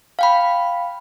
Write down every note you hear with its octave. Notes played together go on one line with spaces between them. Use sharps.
F5 G5 B5